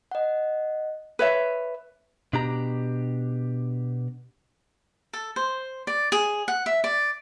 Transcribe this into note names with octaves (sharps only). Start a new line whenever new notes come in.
D#5 F#5
B4 C#5 E5
B2 D4 G4 A#5
A4
C5
D5
G#4
F#5
E5
D5